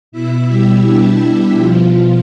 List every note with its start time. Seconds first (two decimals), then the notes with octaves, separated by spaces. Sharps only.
0.12 B2 E4 E5
0.48 G3 G4
0.84 D4
1.21 D4
1.57 B2 F3 F4